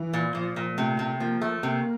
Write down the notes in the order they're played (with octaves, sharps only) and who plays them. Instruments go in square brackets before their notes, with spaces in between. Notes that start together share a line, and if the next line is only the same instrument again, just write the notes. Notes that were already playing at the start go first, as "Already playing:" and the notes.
Already playing: [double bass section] E3
[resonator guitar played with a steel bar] A#2
[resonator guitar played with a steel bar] A#2 [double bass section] F3
[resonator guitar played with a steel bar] A#2
[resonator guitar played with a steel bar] C3 [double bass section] A3
[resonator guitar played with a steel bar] C3
[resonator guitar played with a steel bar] F3 [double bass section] A#3
[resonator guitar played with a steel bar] A3
[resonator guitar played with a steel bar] C3 [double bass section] A#3